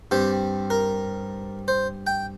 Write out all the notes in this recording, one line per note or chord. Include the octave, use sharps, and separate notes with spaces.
G2 G3 C4 G4
A#4
C5
G5